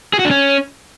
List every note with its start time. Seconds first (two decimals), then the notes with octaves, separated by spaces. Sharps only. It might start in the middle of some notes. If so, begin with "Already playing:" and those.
0.13 G#4
0.19 F#4
0.25 D4
0.31 C#4